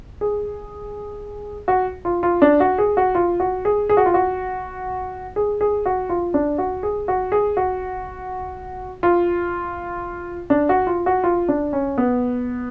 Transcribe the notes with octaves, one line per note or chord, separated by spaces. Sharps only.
G#4
F#4
F4
F4
D4
F#4
G#4
F#4
F4
F#4
G#4
G#4
F#4
F4
F#4
G#4
G#4
F#4
F4
D4
F#4
G#4
F#4
G#4
F#4
F4
D4
F#4
F4
F#4
F4
D4
C#4
B3